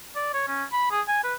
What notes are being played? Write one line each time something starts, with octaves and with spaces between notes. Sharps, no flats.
D5
C#5
C#4
B5
G#4
G#5
B4